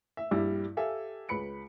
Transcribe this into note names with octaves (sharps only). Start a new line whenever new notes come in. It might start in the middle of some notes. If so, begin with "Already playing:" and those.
E5
A#1 G2 G3 E4 E6
G4 A4 E5 F5 G#5
C#2 B4 B5 C#7 D7